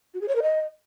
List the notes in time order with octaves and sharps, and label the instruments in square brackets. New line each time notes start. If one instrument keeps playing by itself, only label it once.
[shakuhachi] F#4
G#4
C#5
A#4
D#5